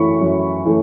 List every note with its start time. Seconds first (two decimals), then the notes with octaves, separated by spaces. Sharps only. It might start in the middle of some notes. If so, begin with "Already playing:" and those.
Already playing: F#2 E3 A3 E4 B5 C#6
0.21 F#2
0.65 E3 A3